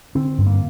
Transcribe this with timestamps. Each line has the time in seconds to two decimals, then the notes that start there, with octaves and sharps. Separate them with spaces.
0.15 D3 C4
0.38 G2
0.46 A#3